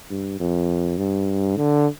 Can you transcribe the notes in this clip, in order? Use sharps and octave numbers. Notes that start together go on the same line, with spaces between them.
G2
F2
G2
D3